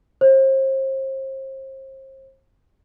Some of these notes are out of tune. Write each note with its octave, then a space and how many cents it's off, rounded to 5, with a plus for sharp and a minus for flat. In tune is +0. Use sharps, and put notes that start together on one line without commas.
C5 +35